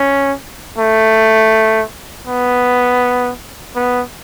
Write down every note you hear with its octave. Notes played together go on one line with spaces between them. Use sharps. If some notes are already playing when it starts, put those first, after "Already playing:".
Already playing: C#4
A3
B3
B3